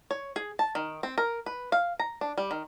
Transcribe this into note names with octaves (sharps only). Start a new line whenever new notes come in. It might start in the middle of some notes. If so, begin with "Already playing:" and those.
C#5
G#4
A5
D#3
C4
A#4
B4
F5
A#5
D4
G3
D#3